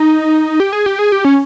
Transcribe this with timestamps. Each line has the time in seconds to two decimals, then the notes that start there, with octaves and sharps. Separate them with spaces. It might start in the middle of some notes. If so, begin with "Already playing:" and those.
Already playing: D#4
0.60 G4
0.73 G#4
0.86 G4
0.99 G#4
1.12 G4
1.25 C#4